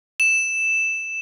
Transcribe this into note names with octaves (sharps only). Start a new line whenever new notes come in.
E7